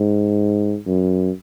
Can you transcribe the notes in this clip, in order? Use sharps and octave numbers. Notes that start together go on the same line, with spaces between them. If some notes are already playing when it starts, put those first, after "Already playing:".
Already playing: G#2
F#2